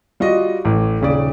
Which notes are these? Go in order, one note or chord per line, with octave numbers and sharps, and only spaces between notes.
G3 F4 F#4 D#5
A1
D#1 C#3 D5